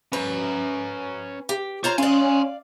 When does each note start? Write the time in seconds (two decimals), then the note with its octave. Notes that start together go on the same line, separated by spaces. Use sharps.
0.13 C#4 B4 A#5
1.49 G4
1.84 F4 C5 C#5 A#5
1.98 C#4 D5 F5 G#5 C6